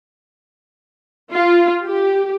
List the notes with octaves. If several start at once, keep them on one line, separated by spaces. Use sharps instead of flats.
F4
G4